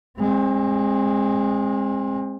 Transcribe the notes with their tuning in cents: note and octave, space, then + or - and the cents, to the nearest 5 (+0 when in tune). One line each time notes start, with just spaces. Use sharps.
G#3 -15 C4 +30